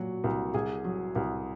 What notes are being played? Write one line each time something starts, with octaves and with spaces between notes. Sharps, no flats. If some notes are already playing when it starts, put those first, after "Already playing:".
Already playing: A#2 F#3 F#4
C2
C2 G#4
F#3
C2